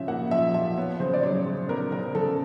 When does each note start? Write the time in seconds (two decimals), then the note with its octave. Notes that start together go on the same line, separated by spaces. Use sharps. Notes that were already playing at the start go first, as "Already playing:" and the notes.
Already playing: C#3 F3 C#4 E5
0.08 A#3 F#5
0.31 F3 E5
0.54 F3 E5
0.77 B3 C#5
1.00 C#3 C5
1.14 D5
1.23 F#3 C#5
1.46 C#3
1.69 B3 A#4
1.92 C#3 A#4
2.15 C#3 A4